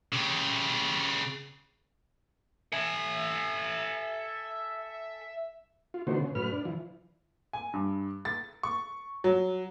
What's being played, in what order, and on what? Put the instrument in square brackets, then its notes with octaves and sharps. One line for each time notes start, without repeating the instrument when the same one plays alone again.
[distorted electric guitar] C#3 G4
[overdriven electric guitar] A4 G#5 [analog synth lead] E5
[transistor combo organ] F4
D3 D#3 A3 B3 F#4 C5
C#3
F#2 A2 B4 F6
D4
E3 F3
[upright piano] G#5
G2
A6
C#6
F#3